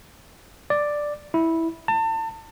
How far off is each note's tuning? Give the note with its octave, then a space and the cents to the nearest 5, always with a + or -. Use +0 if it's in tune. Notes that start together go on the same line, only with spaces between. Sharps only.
D5 +5
E4 -10
A5 +35